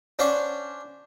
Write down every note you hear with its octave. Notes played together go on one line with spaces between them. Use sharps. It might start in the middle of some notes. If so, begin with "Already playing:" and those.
C#4 D4 C5 F#5 C#6